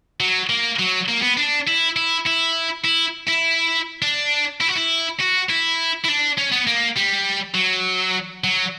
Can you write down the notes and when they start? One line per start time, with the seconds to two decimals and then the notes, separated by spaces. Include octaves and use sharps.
0.20 F#3
0.49 A#3
0.79 F#3
1.09 A#3
1.22 B3
1.37 D4
1.67 E4
1.96 E4
2.26 E4
2.85 E4
3.28 E4
4.02 D4
4.61 E4
4.68 F#4
4.76 E4
5.20 F#4
5.49 E4
6.04 E4
6.08 D4
6.37 C#4
6.52 B3
6.67 A#3
6.97 G3
7.55 F#3
8.44 F#3